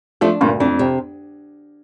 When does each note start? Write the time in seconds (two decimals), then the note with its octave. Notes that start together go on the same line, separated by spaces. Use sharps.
0.21 F3 A3 D4
0.41 D2 G2 A#2
0.60 F2 D4
0.79 C3